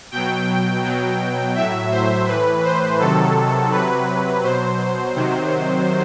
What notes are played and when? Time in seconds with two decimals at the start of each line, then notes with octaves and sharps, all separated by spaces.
0.11 B2 F#3 G5
0.84 B2 F#3
1.55 A2 F#3 E5
1.91 C5
2.27 A2 E3 B4
2.64 C5
2.99 C3 D#3 F#3 A4
3.71 C3 F#3 B4
4.43 B2 F#3 C5
5.15 C3 D#3 F#3